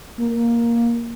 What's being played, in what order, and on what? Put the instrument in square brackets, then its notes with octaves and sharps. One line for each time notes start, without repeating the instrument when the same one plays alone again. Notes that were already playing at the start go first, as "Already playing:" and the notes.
[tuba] A#3